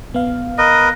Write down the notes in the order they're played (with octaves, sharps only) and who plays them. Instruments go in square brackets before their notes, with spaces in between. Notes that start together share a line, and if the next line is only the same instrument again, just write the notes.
[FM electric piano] A#1 B3 F5
[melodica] A#4 B4 [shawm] D#5